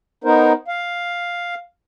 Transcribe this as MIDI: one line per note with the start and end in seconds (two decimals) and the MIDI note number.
0.24 0.52 59
0.24 0.52 63
0.24 0.52 70
0.24 0.52 72
0.68 1.55 77